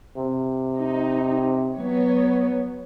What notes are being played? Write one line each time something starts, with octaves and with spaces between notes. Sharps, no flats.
C3
D#4
F#3 B3 C#5